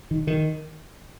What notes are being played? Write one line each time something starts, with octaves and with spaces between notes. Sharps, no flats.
D#3
D#3